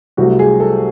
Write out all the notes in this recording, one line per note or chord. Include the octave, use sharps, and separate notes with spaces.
C2 C3 F#3 A3 F#4
G#4
A4